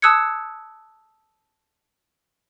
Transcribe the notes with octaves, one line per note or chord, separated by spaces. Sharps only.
A5 D#6 E6 F#6 G#6 C#7